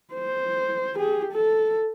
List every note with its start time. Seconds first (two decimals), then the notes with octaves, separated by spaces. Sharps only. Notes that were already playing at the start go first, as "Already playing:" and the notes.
0.13 C5
0.96 G4 G#4
1.32 A4